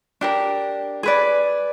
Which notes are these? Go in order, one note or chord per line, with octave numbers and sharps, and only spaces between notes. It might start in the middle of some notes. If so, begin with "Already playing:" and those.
D4 G4 A#4
G#4 B4 D5